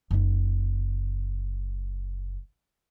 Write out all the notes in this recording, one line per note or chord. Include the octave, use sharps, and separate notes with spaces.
F#1 D#4